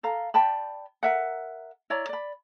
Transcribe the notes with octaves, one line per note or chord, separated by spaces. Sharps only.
A4 F5 A#5
D5 G5 A5 B5
A#4 E5 F#5
E4 C#5 D5 A#5
D5 B5